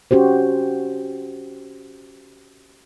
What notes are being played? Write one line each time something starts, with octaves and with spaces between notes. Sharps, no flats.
C#4 F#4 G4 C5